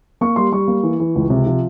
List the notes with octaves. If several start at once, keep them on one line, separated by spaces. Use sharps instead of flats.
A#3 C#6
G3 C6
G3 C#6
A#3
E3
E3
C#2
C3
F3